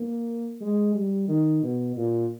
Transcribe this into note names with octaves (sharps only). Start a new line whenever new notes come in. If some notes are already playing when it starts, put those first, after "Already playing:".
Already playing: A#3
G#3
G3
D#3
B2
A#2